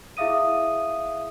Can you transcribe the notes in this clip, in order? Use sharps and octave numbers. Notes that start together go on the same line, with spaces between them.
E4 G#4 E5 F5 D#6 D#7